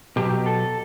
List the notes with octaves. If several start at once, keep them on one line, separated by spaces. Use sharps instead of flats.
B2 F#3 G4
A4